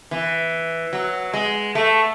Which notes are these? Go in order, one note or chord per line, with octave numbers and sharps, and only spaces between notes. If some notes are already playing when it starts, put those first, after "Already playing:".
E3
F#3
G#3
A3